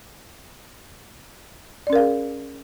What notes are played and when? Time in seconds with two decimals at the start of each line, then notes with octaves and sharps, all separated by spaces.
1.87 D5
1.90 C#4
1.93 A#4
1.96 F5
1.98 G#4